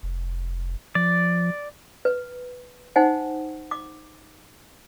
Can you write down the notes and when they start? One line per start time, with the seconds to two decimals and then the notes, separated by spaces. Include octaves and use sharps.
0.03 F1
0.95 F3 D5
2.05 B4
2.96 D#4 C5 F#5 G#5
3.71 D6